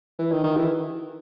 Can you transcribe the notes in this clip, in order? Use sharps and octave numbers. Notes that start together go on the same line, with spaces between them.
E3
D#3
D#3
E3